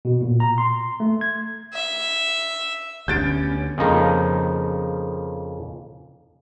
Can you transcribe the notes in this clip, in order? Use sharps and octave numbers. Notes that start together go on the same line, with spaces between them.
B2
A#2
A#5
C6
A3
G#6
E5
D2 D3 G3 B3 C#4 G6 A6 D7
F2 C#3 F3 A#3 D#4